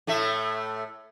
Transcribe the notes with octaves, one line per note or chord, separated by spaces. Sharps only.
A2 A3 E5